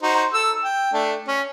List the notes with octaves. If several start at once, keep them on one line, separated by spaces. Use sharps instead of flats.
D#4 F#4 C5
A4 E6
G5
A3 D4
C#4